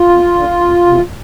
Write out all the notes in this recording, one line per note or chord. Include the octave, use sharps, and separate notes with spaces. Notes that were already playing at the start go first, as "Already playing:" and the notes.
Already playing: F4
F2
D3
F2
C3 E3